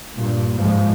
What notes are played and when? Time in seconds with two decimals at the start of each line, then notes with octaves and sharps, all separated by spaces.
0.15 G2 A#2
0.54 G#2 F3 G#3